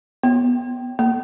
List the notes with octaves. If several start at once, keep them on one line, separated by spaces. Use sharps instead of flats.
B3
A#3